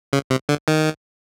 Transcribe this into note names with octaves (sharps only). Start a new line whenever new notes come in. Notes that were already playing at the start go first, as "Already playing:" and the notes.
C#3
C3
D3
D#3